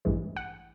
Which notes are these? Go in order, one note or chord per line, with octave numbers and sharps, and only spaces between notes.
A1 G2 E3 G#3
F#5